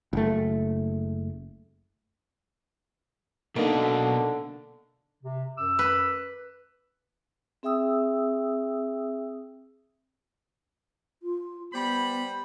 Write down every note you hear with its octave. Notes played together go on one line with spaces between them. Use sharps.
F#1 A3
B1 B2 D3 A#3 D#4
C3
F#2 D6 E6
B4
C4 G#4 E5 G5 D#6 E6
F4
G3 B3 C5 B5